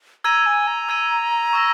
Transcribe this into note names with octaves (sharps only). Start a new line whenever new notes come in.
A#5 E6 G#6 D#7
G#5
A#5
E6 G#6 D#7
C#6 E6 A#6